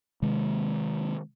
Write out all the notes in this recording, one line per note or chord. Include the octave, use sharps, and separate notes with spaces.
C3 D#3 G#3